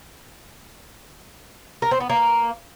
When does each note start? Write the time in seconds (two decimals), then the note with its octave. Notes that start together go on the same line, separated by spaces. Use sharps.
1.82 A#4
1.91 C4
2.00 B3
2.10 A#3